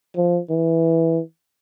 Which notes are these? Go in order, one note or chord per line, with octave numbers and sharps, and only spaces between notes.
F3
E3